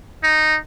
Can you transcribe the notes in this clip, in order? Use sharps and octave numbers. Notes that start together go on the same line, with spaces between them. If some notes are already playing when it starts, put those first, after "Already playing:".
D#4